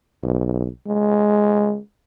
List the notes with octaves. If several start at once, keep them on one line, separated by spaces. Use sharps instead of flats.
B1
G#3